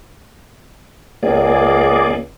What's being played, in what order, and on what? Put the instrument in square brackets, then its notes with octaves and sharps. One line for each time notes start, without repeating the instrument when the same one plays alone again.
[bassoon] C#2 [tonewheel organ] A#3 G#4 D5